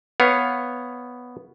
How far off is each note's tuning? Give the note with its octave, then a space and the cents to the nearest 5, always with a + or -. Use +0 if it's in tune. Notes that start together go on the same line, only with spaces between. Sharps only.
B3 +0 C#5 +0 F5 +0